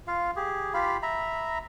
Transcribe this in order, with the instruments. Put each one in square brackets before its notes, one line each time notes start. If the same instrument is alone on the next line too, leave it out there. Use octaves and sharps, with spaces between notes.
[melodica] F4 F5
G4 G#4
F4 G4 F5 B5
E5 A#5 B5